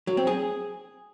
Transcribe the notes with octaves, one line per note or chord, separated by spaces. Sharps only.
F#3
C4
G#4